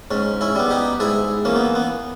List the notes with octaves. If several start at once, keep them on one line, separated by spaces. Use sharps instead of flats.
G#2 C#4
C#4 E4
G3 B3
D#4 G4
G#2 E4 G#4
E3 A#3 C#4
B3
B3